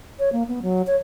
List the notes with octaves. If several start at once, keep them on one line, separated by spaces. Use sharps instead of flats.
C#5
A#3
B3
F#3
C#5